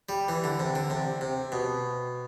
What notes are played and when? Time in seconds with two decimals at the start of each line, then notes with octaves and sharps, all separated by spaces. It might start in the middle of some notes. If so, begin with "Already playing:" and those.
0.09 G3
0.29 E3
0.44 D3
0.59 C3
0.75 D3
0.90 C3
1.21 C3
1.52 B2